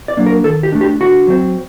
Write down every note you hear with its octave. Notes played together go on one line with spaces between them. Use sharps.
D5
F#3 A#3 D4
A#4
D#3 A4
G4
A3 D4
G4
D3 F#4
F#3 C4